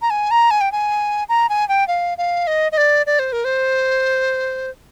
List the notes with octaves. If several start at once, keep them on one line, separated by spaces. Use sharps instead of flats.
A#5
G#5
A#5
G#5
G5
G#5
A#5
G#5
G5
F5
F5
D#5
D#5
D5
D5
C5
A#4
C5